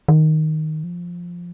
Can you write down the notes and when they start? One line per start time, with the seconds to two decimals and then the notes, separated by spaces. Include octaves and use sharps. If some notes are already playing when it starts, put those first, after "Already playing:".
0.08 D#3
0.84 F3